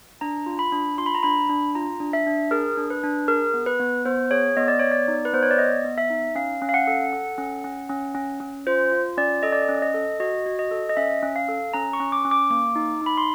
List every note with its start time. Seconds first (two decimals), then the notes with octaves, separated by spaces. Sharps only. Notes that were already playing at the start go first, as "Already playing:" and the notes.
0.21 D4 A#5
0.46 F4
0.59 B5
0.72 D4
0.98 F4 C6
1.06 B5
1.15 A#5
1.23 D4 B5
1.50 D4
1.75 F4 A#5
2.00 D4
2.13 E5
2.27 D4
2.51 G#4 A#4
2.77 D4
2.90 B4
3.03 D4
3.28 G#4 A#4
3.54 B3
3.66 B4
3.80 B3
4.05 B3 C5
4.31 G#4 C#5
4.57 B3 D#5
4.68 D5
4.79 B3 C#5
4.91 D5
5.08 D#4
5.25 B4
5.33 B3 C5
5.43 C#5
5.51 D5
5.58 B3 D#5
5.84 B3
5.98 E5
6.10 D#4
6.35 C#4 F5
6.62 C#4
6.69 F5
6.74 F#5
6.87 A4
7.13 A4
7.38 C#4
7.64 C#4
7.89 C#4
8.15 C#4
8.40 C#4
8.67 F4 C5
8.91 F4
9.17 C#4 D5
9.43 A4 D#5
9.52 D5
9.62 D#5
9.69 C#4
9.82 D#5
9.94 A4
10.20 F#4 D#5
10.46 F#4
10.59 D#5
10.71 A4
10.89 D#5
10.97 C#4 E5
11.22 C#4
11.36 F5
11.49 A4
11.73 C#4 A#5
11.93 C#6
12.00 C#4
12.12 D6
12.25 C#4
12.31 D6
12.50 A#3 D6
12.76 D#4
13.02 D#4 B5
13.17 C6